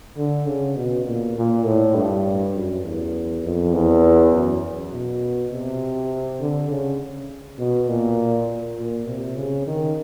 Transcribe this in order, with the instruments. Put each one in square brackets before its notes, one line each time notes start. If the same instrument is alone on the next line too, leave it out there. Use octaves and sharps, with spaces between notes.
[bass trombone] D3
C#3
B2
A#2
A#2
A2
G2
F#2
E2
F2
E2
F#2
B2
C3
D3
C#3
B2
A#2
A#2
C3
C#3
D#3